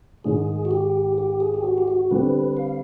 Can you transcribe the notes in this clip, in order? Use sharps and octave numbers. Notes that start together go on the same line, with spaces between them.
G#2 D#3 G#3 G#4
F#4
G4
G4
G#4
G4
F#4
G4
F#4
D3 G3 C4 B4
F5